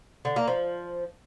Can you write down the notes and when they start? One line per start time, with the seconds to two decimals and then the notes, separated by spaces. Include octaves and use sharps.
0.25 D3
0.36 A#3
0.48 F3